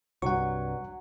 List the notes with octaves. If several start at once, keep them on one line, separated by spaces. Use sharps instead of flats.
C2 G2 F#3 F#5 C#6